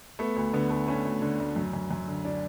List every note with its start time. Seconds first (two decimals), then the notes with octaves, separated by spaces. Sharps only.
0.19 A3 B3
0.36 D2
0.53 D3 B3
0.70 A3
0.88 A3 C#4
1.05 D2
1.22 D3
1.40 D2
1.56 F#2
1.73 F#2
1.91 F#2
2.08 D3
2.25 D4